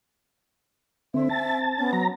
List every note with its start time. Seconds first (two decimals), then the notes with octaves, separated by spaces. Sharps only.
1.14 D3 C4 E5
1.29 C4 A5
1.78 B3 C#4
1.93 F#3 A#5